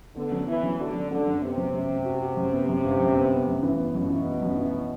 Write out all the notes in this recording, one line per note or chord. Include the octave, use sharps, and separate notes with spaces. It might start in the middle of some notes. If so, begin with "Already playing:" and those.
D3 B3
F#3
E3 B3
F#3
D3 F#4
F#3
D3 F#3
F#2
C3 B3
F#3
F#2
F#2
F#4
F#4
F#2
B3
F#2
G1
F#2
B3
B3
F#2
E3
B3
F#2 B2
E3
B3
F#2
E3